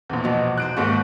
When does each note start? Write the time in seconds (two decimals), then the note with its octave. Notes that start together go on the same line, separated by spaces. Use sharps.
0.09 A#1 E2
0.24 B2 F3
0.58 D#4 C5 F#6 D7
0.77 D#2 G#2 D#3 F#4 B4 G5